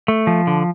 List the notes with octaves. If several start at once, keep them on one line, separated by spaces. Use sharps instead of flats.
A3
F3
D3